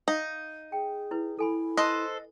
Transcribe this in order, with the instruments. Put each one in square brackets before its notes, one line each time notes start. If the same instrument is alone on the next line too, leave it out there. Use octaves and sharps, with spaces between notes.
[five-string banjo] D#4 [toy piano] F5
[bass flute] G#4 [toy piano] G5
[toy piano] E4 B4
[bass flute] E4 [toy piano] A4 G#5 B5
[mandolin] A4 C5 F#6 [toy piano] B4 [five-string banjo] D#5